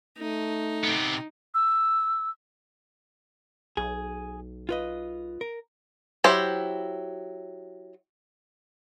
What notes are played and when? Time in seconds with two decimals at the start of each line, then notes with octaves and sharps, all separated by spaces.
0.18 A3 D#4
0.83 C3 B3
1.54 E6
3.77 B1 G#4
4.69 F4 B4 D#5
5.41 A#4
6.24 F#3 E4 G4 C5